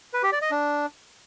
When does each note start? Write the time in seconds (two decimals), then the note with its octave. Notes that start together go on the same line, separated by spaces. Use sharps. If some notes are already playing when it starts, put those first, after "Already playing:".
0.14 B4
0.23 G4
0.32 D5
0.42 D#5
0.51 D4